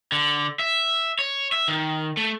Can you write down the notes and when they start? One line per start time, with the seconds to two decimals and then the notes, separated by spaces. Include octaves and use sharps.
0.12 D3
0.59 E5
1.19 C#5
1.52 E5
1.68 D#3
2.17 A3